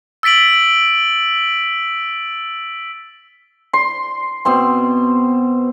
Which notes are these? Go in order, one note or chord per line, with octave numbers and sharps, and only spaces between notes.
E6 A6 B6 D7 F#7
C6
B2 C4 C6